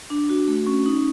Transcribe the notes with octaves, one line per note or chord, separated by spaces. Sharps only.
D4
F#4
A3
C#4
D#4